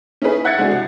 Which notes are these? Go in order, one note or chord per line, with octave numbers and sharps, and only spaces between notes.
C#4 D#4 E4 G#4 B4
E5 F#5 F#6 G#6 A6 C#7
G#3 C4 D4 E4 F#4 G#4
C2